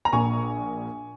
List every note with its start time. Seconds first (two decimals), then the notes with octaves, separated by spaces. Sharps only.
0.05 A#5
0.13 A#1 A#2 G#5 C#6